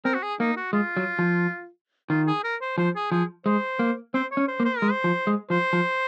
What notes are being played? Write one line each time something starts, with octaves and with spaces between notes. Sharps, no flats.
C4 A#4
F#4
G#4
A#3 D#4
F#4
G#3 F4
F#3
F3
D#3 F4
G#4
A#4
C5
F3 C5
G#4
F3 G#4
G#3 C5
A#3
C4 C5
C#5
C#4
C5
A#3
C5
G#3 A#4
C5
F3
G#3
F3 C5
F3